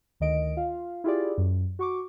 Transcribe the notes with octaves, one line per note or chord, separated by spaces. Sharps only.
D2 D#3 D#5 D7
F4 F5
E4 F4 G4 G#4 D5
F#2
F#4 C#6 D6